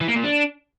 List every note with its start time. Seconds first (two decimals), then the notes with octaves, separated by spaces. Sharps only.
0.01 E3
0.08 A#3
0.16 A#2
0.24 D4